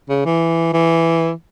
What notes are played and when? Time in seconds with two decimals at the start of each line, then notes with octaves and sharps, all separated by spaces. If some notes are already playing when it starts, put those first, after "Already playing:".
0.09 C#3
0.26 E3
0.73 E3